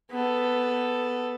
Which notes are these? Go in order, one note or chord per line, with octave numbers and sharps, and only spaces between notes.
B3 A4